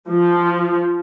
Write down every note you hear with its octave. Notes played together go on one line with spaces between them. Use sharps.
F3